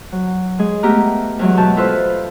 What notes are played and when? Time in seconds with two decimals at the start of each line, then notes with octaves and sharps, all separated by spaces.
0.12 F#3
0.59 G#3 G#4
0.83 A3 B3 G4 A#5 F6
1.39 E2 F#3 G#3
1.57 B2 A5 G6
1.77 E4 F4 A4 B4 C5